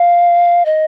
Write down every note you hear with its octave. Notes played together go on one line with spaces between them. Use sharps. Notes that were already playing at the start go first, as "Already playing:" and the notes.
Already playing: F5
D#5